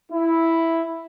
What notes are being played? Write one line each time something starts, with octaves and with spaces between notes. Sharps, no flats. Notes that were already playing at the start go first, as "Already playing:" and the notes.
E4